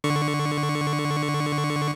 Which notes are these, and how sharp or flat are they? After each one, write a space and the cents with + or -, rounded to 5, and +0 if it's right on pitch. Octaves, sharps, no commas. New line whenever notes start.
D3 +10 C#6 +0